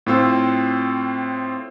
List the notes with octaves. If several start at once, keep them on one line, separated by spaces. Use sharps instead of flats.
A2 C4 F4 C5 E6